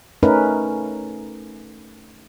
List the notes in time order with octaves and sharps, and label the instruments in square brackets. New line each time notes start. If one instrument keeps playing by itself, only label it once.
[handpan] A3 C#4 D#4 A#4 B4